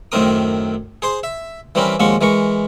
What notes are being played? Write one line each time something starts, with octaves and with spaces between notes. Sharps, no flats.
F#2 A2 D#3 C4 A#4 D#6
G#4 C5 C6
E5
E3 G3 C4 C#4 A#4 B4
D#2 F3 G#3 C#4 F#4 C#6
E3 G#3 A#4 C#6